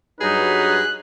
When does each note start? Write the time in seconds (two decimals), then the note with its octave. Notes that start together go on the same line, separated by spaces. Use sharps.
0.21 G2 F#3 D#4 G#4 B4
0.53 F#6